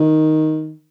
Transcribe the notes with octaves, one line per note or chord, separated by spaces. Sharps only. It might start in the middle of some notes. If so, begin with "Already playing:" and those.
Already playing: D#3